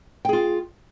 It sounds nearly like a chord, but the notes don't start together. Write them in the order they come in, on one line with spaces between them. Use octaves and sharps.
G5 G#4 F4